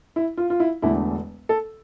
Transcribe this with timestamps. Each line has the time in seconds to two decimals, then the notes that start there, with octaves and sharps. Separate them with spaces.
0.16 E4
0.37 F4
0.50 F4
0.60 E4
0.82 E1 E2 D3 A3 E4
1.49 A4